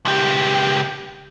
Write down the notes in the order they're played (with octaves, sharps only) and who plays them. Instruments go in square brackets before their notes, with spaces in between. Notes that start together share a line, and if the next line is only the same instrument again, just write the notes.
[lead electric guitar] C#2 G4